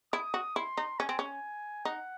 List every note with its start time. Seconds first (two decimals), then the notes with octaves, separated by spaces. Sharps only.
0.13 E4 D#6
0.34 F#4
0.56 E4 C6
0.77 D#4
0.99 C#4 G#5
1.09 C4
1.19 C#4
1.85 D#4 F#5